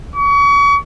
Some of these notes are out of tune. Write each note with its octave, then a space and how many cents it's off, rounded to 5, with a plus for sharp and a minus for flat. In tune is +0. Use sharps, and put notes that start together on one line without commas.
C#6 +35